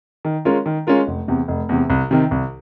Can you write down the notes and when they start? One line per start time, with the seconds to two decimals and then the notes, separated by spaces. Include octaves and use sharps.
0.25 D#3
0.45 G#3 C#4 F4 A#4
0.66 D#3
0.87 G#3 C#4 F4 A#4
1.07 F1
1.28 E2 C3
1.48 F1
1.69 E2 C3
1.90 C2
2.11 C3 D#3
2.31 C2